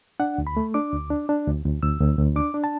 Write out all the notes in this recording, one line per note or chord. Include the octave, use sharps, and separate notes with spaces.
D4 F#5
D2
B5
A3
D4 D6
D2
D4
D4
D2
D2
D2 E6
D2
D2
D4 D6
D4
A5